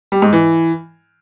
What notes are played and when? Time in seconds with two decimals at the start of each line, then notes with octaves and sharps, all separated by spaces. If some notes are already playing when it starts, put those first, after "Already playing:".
0.12 G3
0.22 G#2
0.33 E3